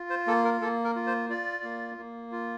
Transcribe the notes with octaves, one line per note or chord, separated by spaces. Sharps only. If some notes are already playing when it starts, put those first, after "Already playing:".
Already playing: F4
C5
A#3 A4
A#4
A#3 A4
A#4
F4
C5
F4 D5
A#3
A#3
F4